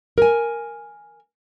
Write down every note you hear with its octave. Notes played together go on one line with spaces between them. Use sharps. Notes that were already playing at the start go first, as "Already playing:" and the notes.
A#4 G#5